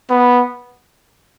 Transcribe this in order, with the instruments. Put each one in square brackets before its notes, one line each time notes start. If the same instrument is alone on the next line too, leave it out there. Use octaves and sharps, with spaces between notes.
[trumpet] B3